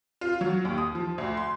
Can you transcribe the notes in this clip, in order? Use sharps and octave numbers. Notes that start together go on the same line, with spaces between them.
F4
F#3
D#2
D#6
F3
D2
C6